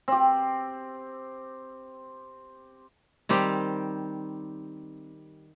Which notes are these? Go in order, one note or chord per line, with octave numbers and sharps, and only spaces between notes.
C4 G4
D#3 G3 C4 G4